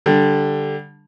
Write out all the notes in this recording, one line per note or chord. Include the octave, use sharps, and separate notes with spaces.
D3 G3